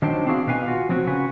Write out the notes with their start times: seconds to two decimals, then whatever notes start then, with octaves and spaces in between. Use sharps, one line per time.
0.02 D#3 F#3 D4 C5 G5
0.26 C4 D4 E4 F#4 G#4 F5
0.47 B2 B4 F5 G#5
0.66 F4 F#4
0.89 F3 F#3 C4 E4 F#4
1.07 C#3 F#4 B4 G#5